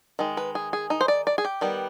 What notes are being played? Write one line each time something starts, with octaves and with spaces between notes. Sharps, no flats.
D#3 G#3
B4
G#4
G#4
D#4
C5
D5
D5
G#4
G4
D#3 G3 B3